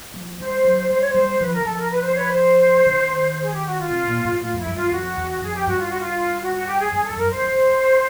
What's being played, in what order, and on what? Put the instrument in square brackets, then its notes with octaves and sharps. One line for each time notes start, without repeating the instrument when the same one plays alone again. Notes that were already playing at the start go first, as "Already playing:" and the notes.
[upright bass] F3
[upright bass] G3 [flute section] C5
[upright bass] F#3
[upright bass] G3 [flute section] C5
[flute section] C#5
C5
[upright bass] G3
[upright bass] F3 [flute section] B4
[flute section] A#4
[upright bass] E3
[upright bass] F3 [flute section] A4
[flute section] A#4
B4
C5
B4 C#5
C5
[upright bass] D3
D#3
[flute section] G#4
G4
F#4
F4
[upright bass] C3
A#2
G#2
[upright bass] A2 [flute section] F4
[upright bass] F2 [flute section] E4
[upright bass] G2
[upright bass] F2 [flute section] F4
[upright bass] F2 [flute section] F#4
[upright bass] E2
[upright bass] F2 [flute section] G#4
[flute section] G4
[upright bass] G2 [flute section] F#4
[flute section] F4
F#4
F4
F#4
F#4
G4
G#4
[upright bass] G2 [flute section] G#4
[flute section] A4
[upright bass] F2
[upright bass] F#2 [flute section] A#4
[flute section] C5
[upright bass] E2
F2